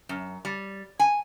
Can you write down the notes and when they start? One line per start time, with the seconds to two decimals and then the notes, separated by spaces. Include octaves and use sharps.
0.09 F#2
0.45 G3
0.99 G#5